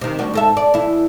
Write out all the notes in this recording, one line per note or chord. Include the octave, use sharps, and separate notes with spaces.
C3 D#3
D2 G3 F#4
G#2 A4 E5
D5
E2 E4